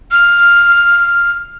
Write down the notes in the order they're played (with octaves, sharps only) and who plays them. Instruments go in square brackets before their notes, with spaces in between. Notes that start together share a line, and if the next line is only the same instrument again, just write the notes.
[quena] F6